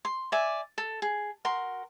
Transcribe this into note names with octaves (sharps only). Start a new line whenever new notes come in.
C6
D5 E5 G#5
A4
G#4
F#4 A#4 C6